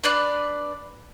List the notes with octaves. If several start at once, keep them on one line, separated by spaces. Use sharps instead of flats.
D4 B4 D5 F#6